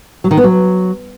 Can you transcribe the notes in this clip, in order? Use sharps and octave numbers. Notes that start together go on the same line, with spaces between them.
F#3
D#3
B3
F#3